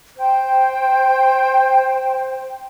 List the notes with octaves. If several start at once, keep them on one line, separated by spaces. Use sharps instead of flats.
C5 G5